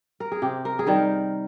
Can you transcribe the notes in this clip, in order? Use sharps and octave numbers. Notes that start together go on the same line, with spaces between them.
A#4
G#4
C3 G4
A#4
G#4
D#3 G3 A#4